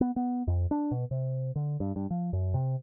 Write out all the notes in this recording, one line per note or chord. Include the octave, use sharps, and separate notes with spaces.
B3
B3
F2
D4
B2
C3
D3
G2
G2
F3
F#2
C3